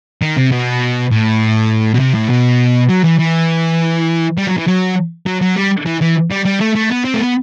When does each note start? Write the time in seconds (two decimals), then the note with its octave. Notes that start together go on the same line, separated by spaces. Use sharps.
0.22 D#3
0.37 C3
0.52 B2
1.11 A2
1.94 B2
2.00 C3
2.15 A2
2.30 B2
2.89 F#3
3.04 E3
3.19 E3
4.38 G3
4.47 F#3
4.58 E3
4.68 F#3
5.26 F#3
5.41 F#3
5.56 G3
5.86 E3
6.01 E3
6.31 G3
6.45 G3
6.60 A3
6.75 A3
6.90 B3
7.05 C4
7.14 A3
7.19 B3